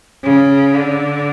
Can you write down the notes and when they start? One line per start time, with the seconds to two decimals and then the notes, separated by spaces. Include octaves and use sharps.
0.24 C#3
0.73 D3